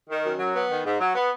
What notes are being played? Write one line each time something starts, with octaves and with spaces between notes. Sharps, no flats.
D#3
F#2
F#3
B3
D#3
G#2
F#3
B3